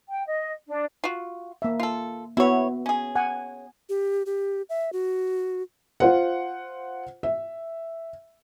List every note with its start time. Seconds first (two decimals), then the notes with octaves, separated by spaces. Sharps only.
0.07 G5
0.26 D#5
0.67 D4
1.04 F4 F#4
1.62 A#3 E5
1.80 F4 A4
2.37 B3 E4 F#4 C#5 E5
2.86 C#4 G#4
3.15 F#5 G#5
3.89 G4
4.26 G4
4.69 E5
4.93 F#4
6.00 F4 C5 F#5
7.23 E5